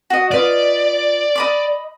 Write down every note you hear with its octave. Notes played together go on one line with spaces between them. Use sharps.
F#4 D#5
F4 B4 D5 D#5
D#5 B5 D6